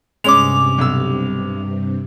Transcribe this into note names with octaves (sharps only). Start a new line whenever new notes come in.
G2 C3 G#3 C#4 D6 F7
B1 E6